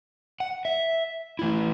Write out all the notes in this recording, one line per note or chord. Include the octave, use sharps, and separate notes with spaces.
F#5
E5
E3 A3 E4